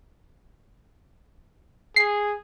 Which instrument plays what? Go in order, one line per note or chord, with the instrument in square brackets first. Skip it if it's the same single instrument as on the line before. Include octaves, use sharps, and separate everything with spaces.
[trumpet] G#4 [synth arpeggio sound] C7